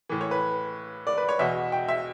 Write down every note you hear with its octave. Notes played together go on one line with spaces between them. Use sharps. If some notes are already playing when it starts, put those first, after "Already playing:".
A2 E3
C#5
B4
D5
B4
C#5
E2 B2 E5
G5
E5